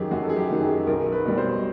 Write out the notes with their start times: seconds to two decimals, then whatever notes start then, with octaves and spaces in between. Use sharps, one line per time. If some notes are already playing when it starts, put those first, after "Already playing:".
Already playing: F#2 D#3 F#3 G4 G#4
0.11 F#2 F#4
0.22 A4
0.29 G#4
0.36 G4
0.50 D#3 F#3
0.62 G#4
0.87 B1 A#4
1.12 B4
1.25 B2 G3
1.38 C5